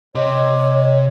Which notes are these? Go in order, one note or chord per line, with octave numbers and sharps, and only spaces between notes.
C3 C#5 D#5 C6 D6